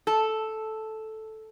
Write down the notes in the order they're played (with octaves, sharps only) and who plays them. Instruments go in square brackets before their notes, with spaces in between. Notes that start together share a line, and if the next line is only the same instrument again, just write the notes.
[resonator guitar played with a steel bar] A4